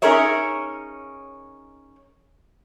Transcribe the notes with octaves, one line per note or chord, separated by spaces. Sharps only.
C#4 D#4 G#4 A#4 C#5 E5